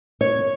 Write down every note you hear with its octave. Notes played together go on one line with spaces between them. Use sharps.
C#5